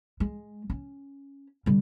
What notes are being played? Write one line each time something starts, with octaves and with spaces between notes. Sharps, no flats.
G#3
C#4
D3 G3